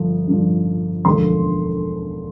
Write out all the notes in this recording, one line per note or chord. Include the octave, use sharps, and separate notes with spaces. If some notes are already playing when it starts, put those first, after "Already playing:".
Already playing: G1 G2 F3
G1 G2 F3
E1 D2 D3 F3 C6